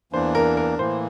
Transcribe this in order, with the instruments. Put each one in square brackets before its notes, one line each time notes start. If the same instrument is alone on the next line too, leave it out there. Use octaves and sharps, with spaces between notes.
[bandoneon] E2 E3 A#3 D4 [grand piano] C5
[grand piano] A#4
A#4
[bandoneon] A2 E3 A#3 [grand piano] C5